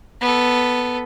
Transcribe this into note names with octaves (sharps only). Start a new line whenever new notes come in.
B3 A4